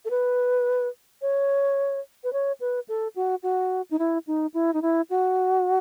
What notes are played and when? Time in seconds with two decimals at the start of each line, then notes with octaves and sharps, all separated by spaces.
0.05 A4
0.10 B4
1.22 C#5
2.24 B4
2.33 C#5
2.60 B4
2.88 A4
3.16 F#4
3.43 F#4
3.91 D#4
3.99 E4
4.27 D#4
4.54 E4
4.73 D#4
4.82 E4
5.10 F#4